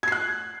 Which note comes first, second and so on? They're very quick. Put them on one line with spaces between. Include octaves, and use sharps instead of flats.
G#6 C7 F#6